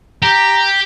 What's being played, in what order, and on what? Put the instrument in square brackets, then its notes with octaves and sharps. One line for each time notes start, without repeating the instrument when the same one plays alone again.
[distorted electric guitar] G4 [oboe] A#5